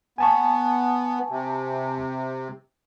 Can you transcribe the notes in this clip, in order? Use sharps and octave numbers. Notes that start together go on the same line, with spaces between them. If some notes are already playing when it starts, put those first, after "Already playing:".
B3 G#5 A5 C#6
C3